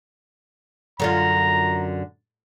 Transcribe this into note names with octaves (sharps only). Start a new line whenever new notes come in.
F#2 D3 F4 A#5